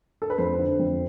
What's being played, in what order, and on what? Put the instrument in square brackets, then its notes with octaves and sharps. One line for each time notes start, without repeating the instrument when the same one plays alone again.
[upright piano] A4
B4
F2 C5
D3
F2